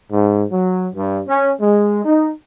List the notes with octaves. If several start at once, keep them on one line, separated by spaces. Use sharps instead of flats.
G#2
F#3
G2
C#4
G#3
D#4